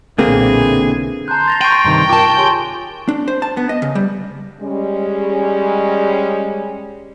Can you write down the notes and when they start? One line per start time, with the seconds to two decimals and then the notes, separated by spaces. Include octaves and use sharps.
0.19 B1 A#2 D3 E3 A#3 C4 G#4
1.28 A5 A#5 C6 F#6 G6
1.48 A6 A#6 F7
1.61 G5 C#6 A#6 D#7
1.85 G2 C3 D#3
2.10 F4 A#4 A5 C#6 D6
2.37 G4 G#4 C#5 G#5 C6 C#6
3.08 D4
3.28 C5
3.42 A5
3.57 B3
3.69 D#5
3.82 C#3
3.95 G3
4.61 G3 G#3 C#4